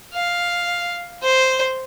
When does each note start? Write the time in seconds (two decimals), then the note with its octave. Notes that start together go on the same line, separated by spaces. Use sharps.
0.14 F5
1.23 C5